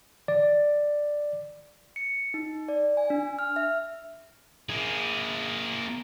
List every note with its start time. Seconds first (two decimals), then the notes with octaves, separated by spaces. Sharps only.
0.28 D5
1.96 C#7
2.34 D#4
2.69 D5
2.97 G#5
3.10 D4
3.39 F6
3.56 E5
4.69 A#3 G#4